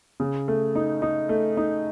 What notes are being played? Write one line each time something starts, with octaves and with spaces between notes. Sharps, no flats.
C#3
A3
D#4
D#4
A3
D#4